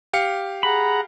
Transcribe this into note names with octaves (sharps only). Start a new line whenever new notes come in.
G4 F5 C#7
G#4 F#5 A#5 B5